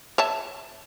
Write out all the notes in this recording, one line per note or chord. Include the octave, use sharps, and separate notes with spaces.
C#5 E5 A5